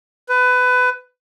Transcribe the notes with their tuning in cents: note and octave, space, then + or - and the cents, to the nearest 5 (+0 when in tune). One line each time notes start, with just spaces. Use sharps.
B4 +20